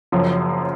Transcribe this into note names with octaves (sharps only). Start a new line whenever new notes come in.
F#1 F#2 F3